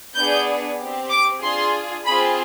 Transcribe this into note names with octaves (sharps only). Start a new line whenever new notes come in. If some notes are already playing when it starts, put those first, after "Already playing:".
B3 D4 G#4 G6
C4 G4
D6
D4 F4 G#4 C6
C4 F4 G#4 B5